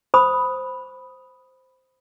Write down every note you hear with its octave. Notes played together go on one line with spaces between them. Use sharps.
C5 B5 D#6